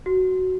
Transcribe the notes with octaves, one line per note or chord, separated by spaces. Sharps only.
F#4